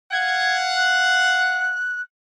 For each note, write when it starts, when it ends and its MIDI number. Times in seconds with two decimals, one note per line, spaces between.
0.12 1.78 77
0.12 1.78 78
0.12 0.56 92
0.75 2.01 90